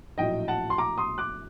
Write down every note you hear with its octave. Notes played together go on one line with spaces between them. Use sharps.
A#1 A2 F#3 D#5 G5
F#5 A5
C6
A#5 D6
C6 D#6
D6 F#6